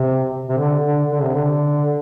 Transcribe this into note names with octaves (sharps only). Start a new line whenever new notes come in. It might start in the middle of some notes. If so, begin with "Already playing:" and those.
Already playing: C3
C3
D3
D3
D3
C3
D3